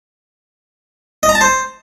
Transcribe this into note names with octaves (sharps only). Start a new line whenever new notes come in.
D#5
A#5
A5
C5